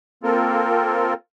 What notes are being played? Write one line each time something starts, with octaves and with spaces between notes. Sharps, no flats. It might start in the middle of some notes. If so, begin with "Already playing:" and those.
A#3 C4 F4 A4 A#4